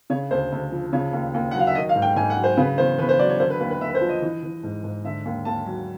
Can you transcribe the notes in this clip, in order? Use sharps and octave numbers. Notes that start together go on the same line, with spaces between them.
C#3 C#5
D2 C5
D2
F3
C#3 C#5
D#2
D#2
F#5
F#3 F5
E5
D#3 D#5
F5
G#2
G5
G#2 G#5
F#5
F#3
C5
C#3 B4
E2 C5
E2 B4
C5
F#3 D5
C#5
D3 C5
B4
D#2 B4
B4
D#2 E5
B4
C5
F3
D#5
E3
E3
G#2
G#2
D3 E5
D#2
D#2 A5
F#3